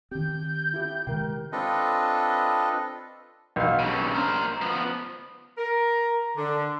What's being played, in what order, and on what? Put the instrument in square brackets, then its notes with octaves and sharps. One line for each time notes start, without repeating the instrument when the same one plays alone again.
[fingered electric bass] D#3 C4 [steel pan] G4 [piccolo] G6
[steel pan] E4 G4
[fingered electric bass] C3 D#3 G#3 [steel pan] A#4 G5
[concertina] C4 D4 F4 A4 B4 D#5
[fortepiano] B1 F5
[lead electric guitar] G2 C#3
A#4 C5
F3 B3
[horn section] A#4
D3